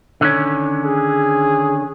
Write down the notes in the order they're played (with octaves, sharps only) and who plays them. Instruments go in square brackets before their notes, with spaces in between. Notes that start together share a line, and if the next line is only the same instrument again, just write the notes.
[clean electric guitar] D3 D#3 C#4
[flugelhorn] G#4